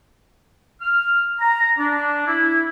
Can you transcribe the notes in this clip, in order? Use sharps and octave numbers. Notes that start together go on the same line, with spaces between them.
F6
A#5
D4
E4